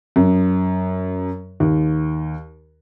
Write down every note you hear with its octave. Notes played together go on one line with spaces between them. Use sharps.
F#2
D#2